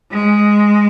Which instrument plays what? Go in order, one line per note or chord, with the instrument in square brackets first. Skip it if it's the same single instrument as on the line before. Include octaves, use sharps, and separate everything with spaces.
[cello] G#3